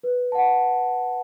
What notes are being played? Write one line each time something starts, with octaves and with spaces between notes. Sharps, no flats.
B4
F#5 A5